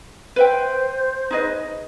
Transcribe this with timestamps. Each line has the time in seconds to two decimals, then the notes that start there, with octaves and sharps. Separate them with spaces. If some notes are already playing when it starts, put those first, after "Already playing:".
0.36 B4 C5 E5 G5
1.31 D#4 G#4 B4 D#5